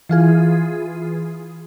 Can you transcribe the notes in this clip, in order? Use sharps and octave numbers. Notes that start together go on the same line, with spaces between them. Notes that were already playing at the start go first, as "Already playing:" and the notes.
E3 F4 G#4